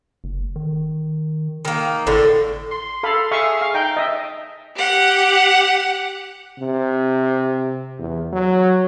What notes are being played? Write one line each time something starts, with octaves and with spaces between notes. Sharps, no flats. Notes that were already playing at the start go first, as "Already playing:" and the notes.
F#1
D#3
D#3 A#3
G#1 A2 D3 D4
C6
A4 F5 B5
G#4 E5 F5 C#6
F5
D#4 G5
D#5 E5
G4 F#5
C3
E2
F#3